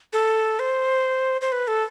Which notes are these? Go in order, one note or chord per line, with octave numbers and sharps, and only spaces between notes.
A4
C5
C5
B4
A4